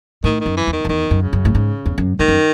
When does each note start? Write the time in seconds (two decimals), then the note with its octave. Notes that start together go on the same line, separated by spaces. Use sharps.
0.24 A2 D#3
0.40 D#3
0.46 F#2
0.57 E3
0.67 E2
0.73 D#3
0.85 F#2
0.89 E2 D#3
1.11 F#2
1.22 C#3
1.33 F#2
1.45 A2
1.55 G#2
1.86 E2
1.98 F#2
2.19 G#2 D#3
2.28 F#2